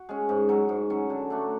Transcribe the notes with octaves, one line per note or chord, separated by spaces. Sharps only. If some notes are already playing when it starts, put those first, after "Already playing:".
Already playing: F#4
G#3 C#4
G#2
F#3 C#4
G#2
F#3 C#4
D3
A3 D4 F#4